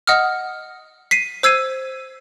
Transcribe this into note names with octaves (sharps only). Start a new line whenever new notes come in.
D#5 F#5 D#6 F6
B6 C7 D#7
C5 E6 G#6 C7 D#7